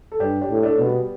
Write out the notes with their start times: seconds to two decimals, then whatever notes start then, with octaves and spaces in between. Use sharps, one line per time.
0.12 A4
0.20 G2 D4 G4
0.41 D4 G4
0.49 A2
0.63 A3 D4
0.76 B2 D4
0.85 G3 B3